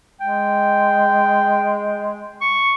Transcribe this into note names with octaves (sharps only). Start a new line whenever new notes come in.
G#3 G5
C#6